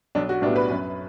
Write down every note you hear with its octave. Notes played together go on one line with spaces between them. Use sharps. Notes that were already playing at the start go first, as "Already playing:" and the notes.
B1 D4
F#4
A2 G3 B3 D4
B4
F#2